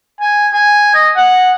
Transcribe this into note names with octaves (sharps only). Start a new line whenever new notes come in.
G#5
G#5
D#5
F#5